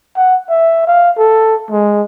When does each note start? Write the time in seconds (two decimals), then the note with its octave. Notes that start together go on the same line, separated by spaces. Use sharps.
0.16 F#5
0.49 E5
0.87 F5
1.18 A4
1.70 G#3